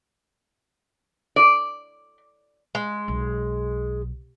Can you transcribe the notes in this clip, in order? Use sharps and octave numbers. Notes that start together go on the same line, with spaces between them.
D5
G#3
B1